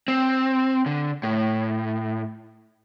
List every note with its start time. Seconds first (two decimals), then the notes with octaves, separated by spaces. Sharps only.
0.08 C4
0.86 D3
1.23 A2